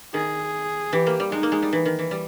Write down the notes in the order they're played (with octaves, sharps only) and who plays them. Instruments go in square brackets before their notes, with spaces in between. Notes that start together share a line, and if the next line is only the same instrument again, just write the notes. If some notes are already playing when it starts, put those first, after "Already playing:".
[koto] D#3 [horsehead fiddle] G#4
[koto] E3 [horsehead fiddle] G4
[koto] A#3
G3
[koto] G#3 [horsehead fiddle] D#4
[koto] A#3
G#3
G3
E3
D#3
E3
G3